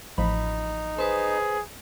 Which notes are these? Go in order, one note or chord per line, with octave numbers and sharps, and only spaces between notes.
A1 F3 D#4 B5
G#4 B4 C5